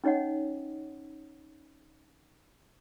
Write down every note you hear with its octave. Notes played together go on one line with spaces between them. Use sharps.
C#4 D#4 C#5 D#5 F#5